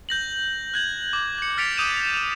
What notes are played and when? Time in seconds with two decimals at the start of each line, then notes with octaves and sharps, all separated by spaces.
0.09 G6 A#6 F#7
0.74 F#6 G#6 F#7
1.13 D6
1.38 G#6 C#7
1.57 F6 A6 B6 C#7 D7 F7
1.77 D6 D#6 G6 D#7 E7